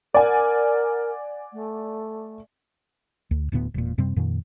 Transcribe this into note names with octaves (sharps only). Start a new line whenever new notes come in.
A#4 D5 F#5 G#5
A3
D2
D1 D2 A2 B3
E1 A#2
F#2 C3 G3 C4
F2 A#2 D#3